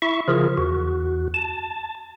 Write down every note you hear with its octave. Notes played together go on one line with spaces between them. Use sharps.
E4 E5 C#6
C#3 F3 F4 G#4 A#4
E2 F#4
A5